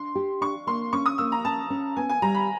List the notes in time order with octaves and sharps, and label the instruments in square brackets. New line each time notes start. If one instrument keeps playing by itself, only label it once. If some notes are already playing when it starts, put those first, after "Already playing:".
Already playing: [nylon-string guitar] D4 [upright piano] C6
[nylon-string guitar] G4
[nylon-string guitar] D4 [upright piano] C#6
[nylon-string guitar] A#3 [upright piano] C6
[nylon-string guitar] C#4 [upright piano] C#6
[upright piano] D#6
[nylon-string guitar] A#3 [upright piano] E6
[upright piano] A#5
[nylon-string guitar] C#4 [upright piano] A5
[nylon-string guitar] C#4
[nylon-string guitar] B3 [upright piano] G#5
[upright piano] G#5
[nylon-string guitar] G3 [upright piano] A#5
[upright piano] B5